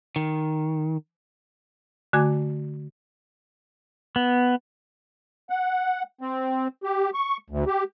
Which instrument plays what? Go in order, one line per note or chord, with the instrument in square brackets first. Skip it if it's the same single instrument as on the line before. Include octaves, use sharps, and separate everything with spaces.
[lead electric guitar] D#3
[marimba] D3 A3 F#4 G#5 D6 G#6
[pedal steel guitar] B3
[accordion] F#5
C4
G4
C#6
D2
G4